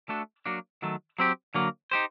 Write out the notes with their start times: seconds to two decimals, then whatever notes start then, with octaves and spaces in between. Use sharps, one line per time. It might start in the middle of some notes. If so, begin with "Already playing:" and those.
0.09 A3 D4 F#4 A4
0.46 F#3 A#3 D4 F#4
0.82 D#3 F#3 A3
1.19 F#3 C4 G4
1.54 D3 F#3 A#3
1.91 D#4 G4 C5